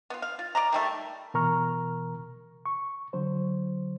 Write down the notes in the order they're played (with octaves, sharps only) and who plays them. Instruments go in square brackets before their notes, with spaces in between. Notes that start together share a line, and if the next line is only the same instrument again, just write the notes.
[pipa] B3 F4
F5
F4
D5 D#5 A#5
D#3 G3 A3
[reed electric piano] B2 E3 A#4 A#5 C#6 F6
C#6
D3 F#3 C5